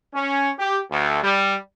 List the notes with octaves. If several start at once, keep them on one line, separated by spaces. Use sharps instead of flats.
C#4
G4
D2
G3